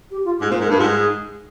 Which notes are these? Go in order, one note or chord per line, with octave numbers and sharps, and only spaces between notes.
G4
F4
G4
G#2
A#2 C5
G#2
A#4
G2
F4
G#2
G#4